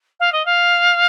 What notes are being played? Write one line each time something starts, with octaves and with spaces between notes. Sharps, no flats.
F5
D#5
F5